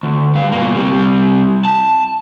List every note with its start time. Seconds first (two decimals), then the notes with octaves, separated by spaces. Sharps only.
0.03 D2
0.35 G2 F5
0.52 B2 A#3
0.76 C3 G3
1.65 A5